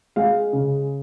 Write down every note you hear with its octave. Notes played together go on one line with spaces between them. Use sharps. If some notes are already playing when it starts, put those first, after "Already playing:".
G#3 F5
C#3